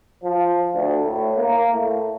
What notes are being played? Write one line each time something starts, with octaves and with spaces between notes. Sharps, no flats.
F3
D2
A2
A#3
A2